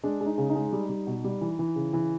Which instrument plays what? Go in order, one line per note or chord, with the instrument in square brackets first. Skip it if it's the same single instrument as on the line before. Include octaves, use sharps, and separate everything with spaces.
[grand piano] G#3 D4
G#3
D#4
C#3
D#4
G#3
G3
G3
B2
G3
E3
E3
C#3
E3